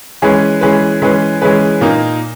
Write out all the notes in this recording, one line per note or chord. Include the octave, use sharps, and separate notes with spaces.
E3 G#3 C#4 G#4 B4
E3 G#3 C#4 G#4 B4
E3 G#3 C#4 G#4 B4
E3 G#3 C#4 G#4 B4
A#2 A#3 D#4